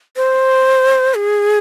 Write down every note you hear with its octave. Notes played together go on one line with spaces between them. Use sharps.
C5
G#4